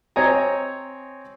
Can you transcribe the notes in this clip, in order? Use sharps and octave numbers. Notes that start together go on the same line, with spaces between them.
C4 C#5 D#5 G#5 A#5